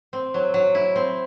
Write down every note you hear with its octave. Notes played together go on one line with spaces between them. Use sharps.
C4
F#3
F#3
E4
C4